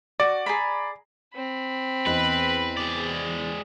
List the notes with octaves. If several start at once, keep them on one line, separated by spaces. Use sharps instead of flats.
F#4 D5
G#4 A#5 B5
C4 B5
E2 B4 C5 D#5
G#3 D5